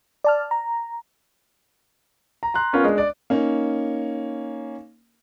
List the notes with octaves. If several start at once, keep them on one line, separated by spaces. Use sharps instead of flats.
D5 A5 F6
A#5
A#5
A#5 C6 F#6
B3 C#4 F4 A#4
G#3 D4
D5
A#3 C#4 D#4